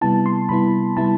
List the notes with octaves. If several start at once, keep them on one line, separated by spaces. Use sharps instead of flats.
C3 G3 B3 E4 A5
C6
C3 G3 B3 E4 B5
C3 G3 B3 E4 A5